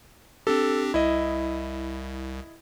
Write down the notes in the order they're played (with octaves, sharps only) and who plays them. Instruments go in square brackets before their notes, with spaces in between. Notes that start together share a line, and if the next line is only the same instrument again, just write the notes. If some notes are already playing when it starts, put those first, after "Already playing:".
[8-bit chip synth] C4 D4 G4 [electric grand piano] A4
[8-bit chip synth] C2 [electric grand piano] E4 D#5